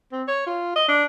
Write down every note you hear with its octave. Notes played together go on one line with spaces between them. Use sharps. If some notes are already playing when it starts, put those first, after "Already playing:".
C4
C#5
F4
D#5
D4